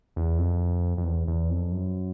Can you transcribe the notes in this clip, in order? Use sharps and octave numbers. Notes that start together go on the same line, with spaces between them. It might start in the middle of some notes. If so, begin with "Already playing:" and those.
E2
F2
F2
E2
E2
F2
F#2